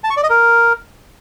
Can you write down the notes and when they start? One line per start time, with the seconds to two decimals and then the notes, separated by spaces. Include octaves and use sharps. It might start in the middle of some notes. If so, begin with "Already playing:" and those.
0.04 A5
0.10 C#6
0.17 D5
0.23 D#5
0.30 A#4